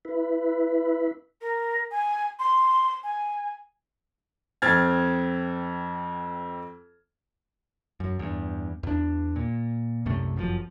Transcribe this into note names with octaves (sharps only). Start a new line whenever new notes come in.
E4 B4
A#4
G#5
C6
G#5
F2 C4 F6 G#6 A6
F#2
E2 G2
E2 D4
A#2
C2 F#2 C3 A3
G1 F#2 D3 F3